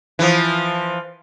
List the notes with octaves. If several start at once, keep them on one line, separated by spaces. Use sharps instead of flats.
E3 F3